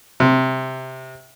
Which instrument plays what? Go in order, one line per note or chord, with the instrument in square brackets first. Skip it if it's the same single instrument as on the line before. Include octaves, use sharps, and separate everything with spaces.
[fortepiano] C3